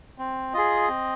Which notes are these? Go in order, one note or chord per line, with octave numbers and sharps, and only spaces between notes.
C4
F4 G#4 D#5
C4